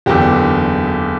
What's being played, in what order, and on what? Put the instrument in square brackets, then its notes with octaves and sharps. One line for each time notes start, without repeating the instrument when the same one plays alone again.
[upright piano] F#1 E2 D3 G4